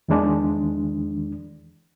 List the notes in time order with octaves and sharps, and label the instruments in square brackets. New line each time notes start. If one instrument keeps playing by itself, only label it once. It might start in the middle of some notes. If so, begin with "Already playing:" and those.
[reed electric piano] E2 D#3 E3 G#3 D4